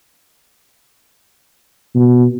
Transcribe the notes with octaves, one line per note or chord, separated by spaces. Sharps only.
B2